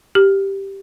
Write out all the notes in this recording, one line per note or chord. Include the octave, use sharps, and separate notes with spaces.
G4